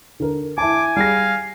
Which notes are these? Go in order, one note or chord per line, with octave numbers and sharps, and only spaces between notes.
D3 A#4
E4 G#5 A5 D6
G3 G#4 F5 A#6